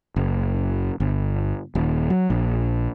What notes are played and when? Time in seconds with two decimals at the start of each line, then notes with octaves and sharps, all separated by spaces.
0.16 F#1
1.00 G1
1.75 D#1
2.10 F#3
2.30 A#1